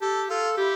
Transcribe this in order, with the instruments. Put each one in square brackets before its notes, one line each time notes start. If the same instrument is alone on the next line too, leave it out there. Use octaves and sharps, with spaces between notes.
[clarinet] G4 [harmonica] A4
[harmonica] F4 [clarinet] A4
[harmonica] E4 [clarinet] G4